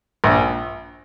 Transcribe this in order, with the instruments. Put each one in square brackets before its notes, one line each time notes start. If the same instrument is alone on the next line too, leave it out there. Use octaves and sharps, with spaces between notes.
[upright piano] A#1